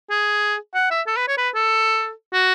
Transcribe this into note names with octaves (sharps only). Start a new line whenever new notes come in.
G#4
F#5
E5
A4
B4
C#5
B4
A4
F#4